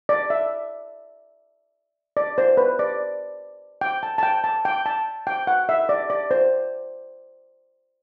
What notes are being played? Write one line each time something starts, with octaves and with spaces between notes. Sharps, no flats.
D5
E5
D5
C5
B4
D5
G5
A5
A5
G5
A5
G5
A5
G5
F#5
E5
D5
D5
C5